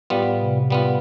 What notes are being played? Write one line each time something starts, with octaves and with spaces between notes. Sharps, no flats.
A2 G3 B3 F4
C3
G3 B3 F4